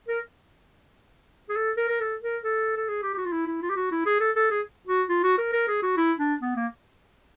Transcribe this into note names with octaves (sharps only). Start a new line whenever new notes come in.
A#4
G#4
A4
A#4
A#4
A4
A#4
A4
A4
G#4
G4
G4
F#4
F4
E4
E4
F4
G4
F#4
E4
G#4
A4
A4
G#4
F#4
F4
F#4
A#4
A#4
G#4
F#4
E4
D4
B3
A#3